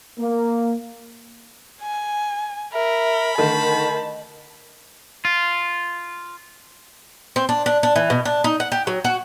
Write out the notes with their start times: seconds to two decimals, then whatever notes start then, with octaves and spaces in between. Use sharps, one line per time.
0.18 A#3
1.82 G#5
2.73 A#4 E5 B5
3.38 D3 D#3 A3 D#5 A5
5.25 F4
7.36 C4
7.49 D4
7.66 D4
7.83 D4
7.96 E3
8.10 B2
8.25 D4
8.44 D#4
8.60 F#5
8.72 G4
8.87 F#3
9.04 F#4